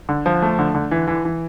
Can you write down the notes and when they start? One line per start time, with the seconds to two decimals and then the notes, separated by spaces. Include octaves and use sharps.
0.09 D3
0.26 F3
0.42 A3
0.59 D3
0.75 D3
0.91 E3
1.07 E3
1.25 E3